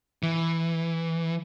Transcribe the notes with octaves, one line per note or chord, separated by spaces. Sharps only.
E3